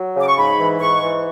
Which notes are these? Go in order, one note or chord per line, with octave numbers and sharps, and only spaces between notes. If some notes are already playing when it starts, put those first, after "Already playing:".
Already playing: F#3
C#3
D6
C#6
G#2 B5
E3
G#2 C#6
E3